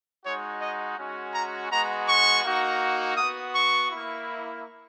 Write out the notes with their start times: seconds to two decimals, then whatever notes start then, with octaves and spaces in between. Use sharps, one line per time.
0.24 G#3 D#4 F#4 C#5
0.61 D#5
0.98 G#3 C#4 F#4
1.34 A#5
1.70 G#3 B3 F#4 A#5
2.07 C#6
2.44 A#3 D#4 F#4
3.17 B3 F#4 D#6
3.54 C#6
3.90 A#3 E4